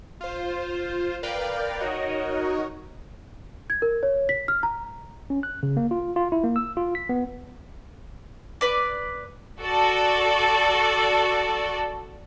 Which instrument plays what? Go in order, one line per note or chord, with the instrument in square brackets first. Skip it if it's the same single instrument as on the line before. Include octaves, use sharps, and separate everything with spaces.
[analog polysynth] F4 C5
A#4 B4 D5 F5 G5
D#4 F#4 A#4 C#5 D#5
[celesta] G#6
A#4
C#5
B6
F6
A#5
[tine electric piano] C#4
F#6
C#3
A#3
F4
F4
E4
A#3
E6
F4
B6
B3
[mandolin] B4 D5
[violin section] F#4 A4 D5